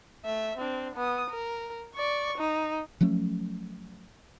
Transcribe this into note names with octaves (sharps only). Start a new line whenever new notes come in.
A3 E5
C4 D4
B3 D#6
A#4
D5 C#6
D#4
F3 F#3 A3 C#4